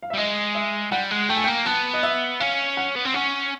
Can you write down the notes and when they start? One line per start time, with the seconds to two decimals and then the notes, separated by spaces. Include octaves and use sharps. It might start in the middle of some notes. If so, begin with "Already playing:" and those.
0.02 F5
0.10 E5
0.14 G3
0.17 G#3 D#5
0.55 E5
0.91 G3 F#5
1.11 G#3
1.29 A3 G5
1.37 G#5
1.44 A#3 G5
1.66 B3 A5
1.94 D#5
2.03 E5
2.40 C#4 F5
2.77 F#5
2.95 B3
3.05 C4
3.14 C#4 F#5